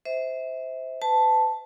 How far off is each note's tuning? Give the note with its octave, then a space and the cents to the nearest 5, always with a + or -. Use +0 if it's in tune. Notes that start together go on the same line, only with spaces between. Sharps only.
C5 -10 E5 -25
B4 +35 A5 +0